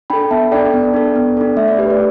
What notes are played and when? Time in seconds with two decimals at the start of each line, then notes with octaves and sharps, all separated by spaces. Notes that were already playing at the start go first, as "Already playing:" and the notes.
0.10 D4 A4 G5 B5
0.31 B3 E5 A5
0.52 D4 A4 D5 G5
0.74 B3
0.94 D4 A4
1.15 B3
1.37 D4 A4
1.57 A3 E5
1.68 D5
1.78 G4 B4
1.90 D5